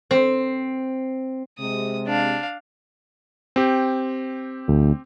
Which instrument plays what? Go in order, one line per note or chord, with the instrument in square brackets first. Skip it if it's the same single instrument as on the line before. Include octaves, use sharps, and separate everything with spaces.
[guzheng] C4
[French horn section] C3 G#3 [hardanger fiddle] D#6
[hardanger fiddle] D4 F5
[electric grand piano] C4 G4
[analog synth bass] D2